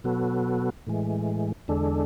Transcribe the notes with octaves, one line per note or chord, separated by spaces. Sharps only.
B2 F#3 B3 F#4 A4
A2 E3 G#3
E2 D3 G#3 D4 A4